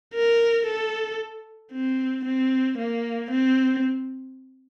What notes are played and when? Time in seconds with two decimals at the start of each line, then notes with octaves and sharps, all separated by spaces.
0.14 A#4
0.67 A4
1.73 C4
2.25 C4
2.79 A#3
3.31 C4